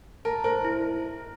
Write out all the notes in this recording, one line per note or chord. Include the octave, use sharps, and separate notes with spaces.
A#4 A5
A#4 C5
E4